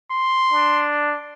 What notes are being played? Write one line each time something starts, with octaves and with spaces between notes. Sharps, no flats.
C6
D4